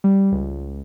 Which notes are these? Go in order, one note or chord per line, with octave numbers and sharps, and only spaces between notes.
G3
C#2